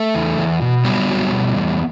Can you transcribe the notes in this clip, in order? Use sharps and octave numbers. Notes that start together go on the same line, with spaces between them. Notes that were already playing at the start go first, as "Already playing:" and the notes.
Already playing: A3
E2
E2
B2
F#3 G3 B3
F#3
B2
E2